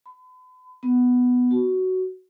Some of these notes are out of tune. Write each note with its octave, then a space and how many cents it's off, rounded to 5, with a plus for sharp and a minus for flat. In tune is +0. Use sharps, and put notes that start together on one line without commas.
B5 +40
B3 +5
F#4 +10